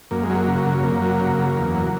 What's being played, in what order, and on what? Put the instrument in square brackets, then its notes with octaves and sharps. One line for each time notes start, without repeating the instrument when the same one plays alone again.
[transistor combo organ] F#2 A#3
G#3
F#3
A#3
C#3
F#2
F#2 A#3
F#3
C#3
F#2
E2
F#3